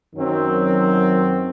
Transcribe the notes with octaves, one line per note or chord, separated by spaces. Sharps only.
F#2 D#3 F#3 C4